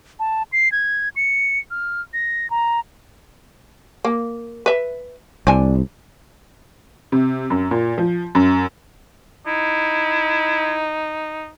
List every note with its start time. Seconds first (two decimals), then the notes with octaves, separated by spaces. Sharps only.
0.20 A5
0.53 C7
0.72 G#6
1.16 C#7
1.71 F6
2.13 A#6
2.50 A#5
4.05 A#3
4.66 B4 E5
5.47 C2 C4 D4 G#5
7.12 C3
7.50 F#2
7.71 A#2
7.98 F3
8.35 F#2
9.47 D#4 E4